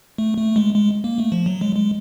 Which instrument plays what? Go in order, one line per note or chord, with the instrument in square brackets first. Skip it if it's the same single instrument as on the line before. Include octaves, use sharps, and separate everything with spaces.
[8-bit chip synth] A3
A3
G#3
G#3
A#3
A3
F3
F#3
G#3
G#3